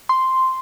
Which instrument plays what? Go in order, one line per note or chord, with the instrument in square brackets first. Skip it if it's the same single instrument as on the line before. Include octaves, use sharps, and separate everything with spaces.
[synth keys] C6